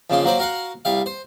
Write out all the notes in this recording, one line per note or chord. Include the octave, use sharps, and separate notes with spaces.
F2 C#3 A#3 C6
F#3 A#3 C5 D5
F#4 A#4 F5 F#5
C2 G3 F5
C5